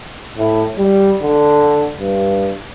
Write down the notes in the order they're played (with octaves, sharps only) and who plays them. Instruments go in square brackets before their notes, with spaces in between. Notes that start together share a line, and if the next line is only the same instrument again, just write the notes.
[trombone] A2
G3
D3
G2